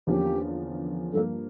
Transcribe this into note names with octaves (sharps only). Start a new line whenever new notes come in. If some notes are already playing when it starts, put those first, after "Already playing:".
E2 D3 F3 A#3 C#4 G4
G2 F3 A#3 A4